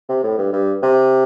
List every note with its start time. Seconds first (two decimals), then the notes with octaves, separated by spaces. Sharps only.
0.09 C3
0.23 A2
0.38 G2
0.53 G2
0.82 C3